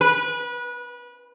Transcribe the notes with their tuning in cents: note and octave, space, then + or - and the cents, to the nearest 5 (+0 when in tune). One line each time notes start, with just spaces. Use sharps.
B4 -25